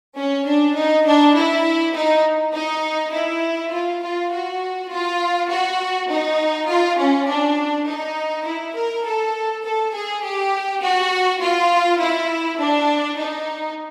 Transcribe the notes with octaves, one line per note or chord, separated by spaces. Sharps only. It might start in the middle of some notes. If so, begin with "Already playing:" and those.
C#4
D4
D#4
D4
E4
D#4
D#4
E4
F4
F4
F#4
F4
F#4
D#4
F4
C#4
D4
D#4
E4
A#4
A4
A4
G#4
G4
F#4
F4
E4
D4
D#4